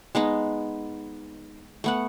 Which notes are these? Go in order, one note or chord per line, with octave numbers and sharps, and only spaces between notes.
G#3 B3 D#4
A3 B3 F#5